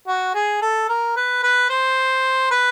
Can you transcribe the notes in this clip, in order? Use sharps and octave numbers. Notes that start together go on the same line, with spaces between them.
F#4
G#4
A4
A#4
B4
B4
C5
B4